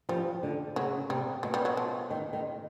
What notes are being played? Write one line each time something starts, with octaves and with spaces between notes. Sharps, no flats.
F3 G3
D3
C#3 F#3
C3 G3
B2 F#3
G3
F#3
F3
D#3
D#3